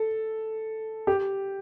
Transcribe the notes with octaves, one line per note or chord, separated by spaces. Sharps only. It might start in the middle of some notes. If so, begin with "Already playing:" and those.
Already playing: A4
G4